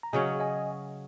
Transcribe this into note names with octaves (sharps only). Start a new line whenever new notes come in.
A#5
C#3 F#3 C#4 D#5 G#5
D#5 G#5